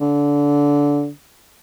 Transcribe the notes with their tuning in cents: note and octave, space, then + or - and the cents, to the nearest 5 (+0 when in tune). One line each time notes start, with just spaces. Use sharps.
D3 -20